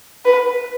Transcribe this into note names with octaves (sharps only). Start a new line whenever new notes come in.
B4